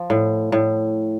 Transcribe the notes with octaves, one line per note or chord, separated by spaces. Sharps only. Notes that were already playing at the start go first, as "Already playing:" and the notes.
Already playing: F3
A2
A2